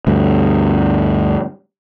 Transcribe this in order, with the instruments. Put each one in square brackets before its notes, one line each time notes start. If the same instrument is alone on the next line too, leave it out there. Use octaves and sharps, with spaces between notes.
[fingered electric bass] D2 G2